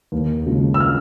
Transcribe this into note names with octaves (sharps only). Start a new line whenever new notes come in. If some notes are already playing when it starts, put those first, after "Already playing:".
D#2
C#3 F3 G#3
E6
F6